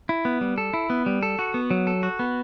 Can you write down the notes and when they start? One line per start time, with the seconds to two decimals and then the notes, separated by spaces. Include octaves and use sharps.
0.09 E4
0.25 B3
0.41 G3
0.58 A4
0.74 E4
0.90 B3
1.06 G3
1.23 A4
1.39 F#4
1.54 B3
1.71 F#3
1.87 A4
2.03 F#4
2.19 B3